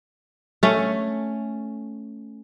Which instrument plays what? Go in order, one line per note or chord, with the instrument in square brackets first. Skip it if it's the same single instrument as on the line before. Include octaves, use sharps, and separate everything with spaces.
[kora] A3 C#4